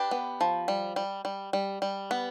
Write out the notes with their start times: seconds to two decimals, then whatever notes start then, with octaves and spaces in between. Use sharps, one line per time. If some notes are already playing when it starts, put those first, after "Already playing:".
Already playing: D4 G4 B4
0.11 B3
0.41 F3
0.68 G3
0.96 G3
1.25 G3
1.53 G3
1.82 G3
2.11 B3